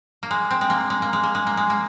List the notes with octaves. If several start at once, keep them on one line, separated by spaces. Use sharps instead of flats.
A#3
G#3
C4
G#3
A#3
G#3
A#3
G#3
A#3
G#3
A#3
G#3
A#3